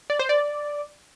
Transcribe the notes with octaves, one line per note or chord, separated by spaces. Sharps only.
D5
C5
D5